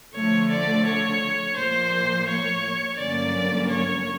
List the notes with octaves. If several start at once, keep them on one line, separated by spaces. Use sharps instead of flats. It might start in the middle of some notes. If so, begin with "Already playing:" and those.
D3 F3 A3 C#5
D5
C#5
A#2 F3 A#3 C5
C#5
G2 D3 F#3 A#3 C#4 D5
C#5